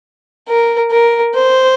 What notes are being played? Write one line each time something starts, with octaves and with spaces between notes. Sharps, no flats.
A#4
A#4
C5